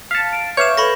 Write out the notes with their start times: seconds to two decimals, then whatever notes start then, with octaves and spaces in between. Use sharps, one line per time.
0.11 F5 A5 B6 C#7
0.33 D7
0.57 B4 C#5 E5 F5 D6 G6 E7
0.77 A4 B4 B5 C#6 A#6